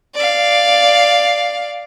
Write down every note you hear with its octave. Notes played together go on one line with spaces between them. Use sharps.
D5 F5